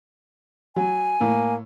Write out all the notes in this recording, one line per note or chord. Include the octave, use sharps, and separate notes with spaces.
F#3 G#5
A2 A#3